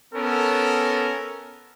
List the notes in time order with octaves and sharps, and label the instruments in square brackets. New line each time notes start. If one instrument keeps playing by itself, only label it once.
[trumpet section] B3 C#4 A4 A#4